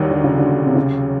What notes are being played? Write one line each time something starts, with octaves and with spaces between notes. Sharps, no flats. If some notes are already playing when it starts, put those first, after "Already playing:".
Already playing: D#2 D#3 F#3 G3
D3
C#3
D3
C3
C#3